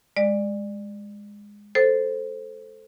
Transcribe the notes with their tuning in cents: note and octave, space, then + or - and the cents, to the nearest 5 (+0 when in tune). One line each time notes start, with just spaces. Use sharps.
G#3 -15 D5 +20
A4 +0 C5 +0